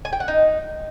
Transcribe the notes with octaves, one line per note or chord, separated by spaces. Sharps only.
G#5
G5
F#5
D#4